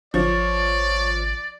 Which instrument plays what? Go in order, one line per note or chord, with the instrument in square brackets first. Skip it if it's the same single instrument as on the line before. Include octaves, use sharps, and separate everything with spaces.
[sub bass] G#1 [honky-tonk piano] F3 [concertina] C#5 [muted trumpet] D5